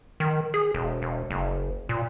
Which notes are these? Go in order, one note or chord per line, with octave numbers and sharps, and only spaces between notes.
D#3
G#4
E1
E1
F#1
A#2